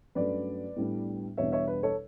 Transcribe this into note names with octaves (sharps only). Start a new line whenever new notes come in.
G2 F#3 A3 C#4 B4 D5
A2 G3 B3 D4
E2 B2 G3 D4 C#5 E5
C#5 E5
B4
A4 C#5